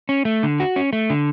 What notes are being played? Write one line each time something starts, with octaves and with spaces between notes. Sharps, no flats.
C#4
A3
D3
F#4
C#4
A3
D3